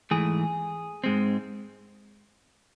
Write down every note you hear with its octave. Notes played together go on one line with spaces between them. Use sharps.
G#2 E3 A3 G#4
G#2 G#3 C4